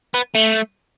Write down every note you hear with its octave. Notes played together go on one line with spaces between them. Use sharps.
B3
A3